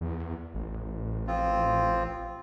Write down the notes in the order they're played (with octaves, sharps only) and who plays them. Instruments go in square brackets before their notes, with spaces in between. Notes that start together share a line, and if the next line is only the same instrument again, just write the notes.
[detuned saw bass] E2
A1
[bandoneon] F3 C4 F4